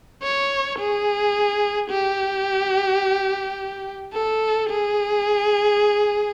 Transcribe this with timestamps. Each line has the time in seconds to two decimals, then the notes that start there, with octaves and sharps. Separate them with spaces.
0.23 C#5
0.79 G#4
1.90 G4
4.13 A4
4.70 G#4